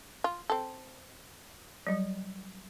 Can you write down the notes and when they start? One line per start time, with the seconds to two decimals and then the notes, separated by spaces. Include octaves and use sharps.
0.24 F4
0.50 C4 A4
1.87 F#3 G3